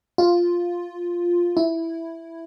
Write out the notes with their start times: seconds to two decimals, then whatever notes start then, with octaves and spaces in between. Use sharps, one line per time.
0.18 F4
1.57 E4